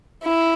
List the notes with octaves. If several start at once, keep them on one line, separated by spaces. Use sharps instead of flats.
E4